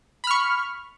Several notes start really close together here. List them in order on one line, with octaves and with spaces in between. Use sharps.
B5 F6 C#6